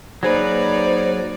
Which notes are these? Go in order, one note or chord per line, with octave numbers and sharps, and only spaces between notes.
F#3 A#3 D#4 G#4 B4 C5 D5